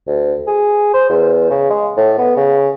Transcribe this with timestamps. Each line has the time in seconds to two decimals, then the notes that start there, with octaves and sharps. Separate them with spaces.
0.07 D2
0.47 G#4
0.94 C5
1.09 E2
1.51 C#3
1.70 G#3
1.97 A2
2.18 B3
2.37 C#3